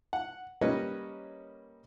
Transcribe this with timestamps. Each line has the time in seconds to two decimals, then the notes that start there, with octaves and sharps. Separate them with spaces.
0.13 F#5
0.61 G3 A#3 C#4 B4 C#5 D#5